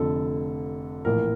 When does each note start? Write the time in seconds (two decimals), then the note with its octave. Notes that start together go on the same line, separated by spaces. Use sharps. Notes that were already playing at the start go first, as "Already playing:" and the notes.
Already playing: F1 F2 D3 A4
1.05 A#1 A2 E3 A#4